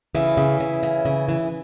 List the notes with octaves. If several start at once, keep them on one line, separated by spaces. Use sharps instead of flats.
C#3 E3 E4
C#3
C#3
C#3
C#3
E3